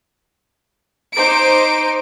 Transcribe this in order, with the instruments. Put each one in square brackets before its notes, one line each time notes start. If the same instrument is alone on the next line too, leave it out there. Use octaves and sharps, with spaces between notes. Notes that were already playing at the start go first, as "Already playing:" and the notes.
[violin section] D#4 C5 D6 D7